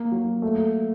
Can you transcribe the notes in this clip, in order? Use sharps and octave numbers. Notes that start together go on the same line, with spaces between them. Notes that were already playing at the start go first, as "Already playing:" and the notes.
Already playing: A#3
F#3
A3